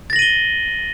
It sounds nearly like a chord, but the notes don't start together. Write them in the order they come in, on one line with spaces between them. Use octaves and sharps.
A6 A#6 F#7 D#7 G7